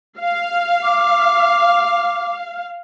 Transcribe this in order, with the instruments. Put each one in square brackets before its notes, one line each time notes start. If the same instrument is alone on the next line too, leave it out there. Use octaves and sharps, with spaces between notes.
[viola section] F5
[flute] D6